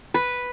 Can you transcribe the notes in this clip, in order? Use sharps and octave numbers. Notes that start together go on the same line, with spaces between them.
B4